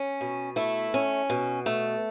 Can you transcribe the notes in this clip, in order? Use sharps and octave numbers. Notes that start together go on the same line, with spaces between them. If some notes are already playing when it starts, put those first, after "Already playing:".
Already playing: C#4
B2
A3 E4
C#4
B2
A3